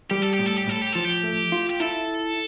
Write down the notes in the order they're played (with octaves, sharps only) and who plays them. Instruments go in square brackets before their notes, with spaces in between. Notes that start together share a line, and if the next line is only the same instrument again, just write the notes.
[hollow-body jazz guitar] G3 [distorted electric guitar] G4
[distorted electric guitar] A4
G4
[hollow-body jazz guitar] A2
[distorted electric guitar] A4
G4
[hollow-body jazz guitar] A2 [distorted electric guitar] A4
[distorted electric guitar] G4
[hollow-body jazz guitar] F3 [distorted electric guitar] A4
[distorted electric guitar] G4
[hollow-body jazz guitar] A3
F4
[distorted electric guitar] G4
[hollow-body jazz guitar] E4 [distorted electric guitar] A4